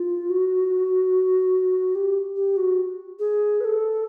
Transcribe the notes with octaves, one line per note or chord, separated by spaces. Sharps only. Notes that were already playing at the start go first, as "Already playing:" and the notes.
Already playing: F4
F#4
G4
G4
F#4
G#4
B4
A4